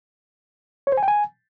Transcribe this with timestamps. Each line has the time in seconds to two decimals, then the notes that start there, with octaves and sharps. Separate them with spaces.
0.87 C#5
0.92 C5
0.97 G#5
1.03 G5
1.08 G#5